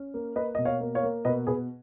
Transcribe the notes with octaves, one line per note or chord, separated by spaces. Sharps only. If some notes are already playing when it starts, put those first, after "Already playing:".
Already playing: C#4
A#3
A#3 B4 D#5
B2 D#5
C#5 F5
A#3
C#5 F5
A#3
B2 B4 D#5
B2 G#4 B4